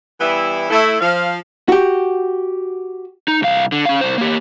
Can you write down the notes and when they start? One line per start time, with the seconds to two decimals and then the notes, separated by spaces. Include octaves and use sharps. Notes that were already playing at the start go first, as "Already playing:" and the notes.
0.21 E3 G3 B3 E4
0.70 A3 E4
1.00 F3 F5
1.69 F#4 G4
3.28 D#4
3.42 C2 F5
3.72 D3
3.85 C#4 F5
4.01 C2 C5
4.18 A#3 G4